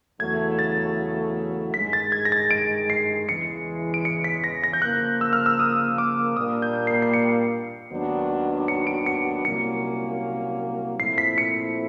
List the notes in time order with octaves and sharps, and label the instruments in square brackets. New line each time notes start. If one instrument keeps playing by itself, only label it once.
[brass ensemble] E2 C#3 F#3 A3 [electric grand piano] G#6
[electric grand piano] A6
[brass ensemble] G2 D#3 G#3 [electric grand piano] B6
[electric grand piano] A6
G#6
A#6
A6
D7
C7
[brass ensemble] E2 C#3 E3 G#3 [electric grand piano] C#7
[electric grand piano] D7
C#7
B6
A#6
A#6
G6
[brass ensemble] C#3 F3 A#3 [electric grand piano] F#6
[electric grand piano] E6
F6
E6
D#6
D6
[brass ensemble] A#2 G3 A#3 D4 [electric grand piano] D#6
[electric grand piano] G6
C7
C7
C#7
[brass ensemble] D#2 D#3 F#3 B3 D4
[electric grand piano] C#7
D7
C#7
[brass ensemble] C2 A#2 F#3 A#3 C#4 [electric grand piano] C#7
[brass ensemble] A#2 F3 A3 C4 E4 [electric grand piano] C7
[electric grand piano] B6
C#7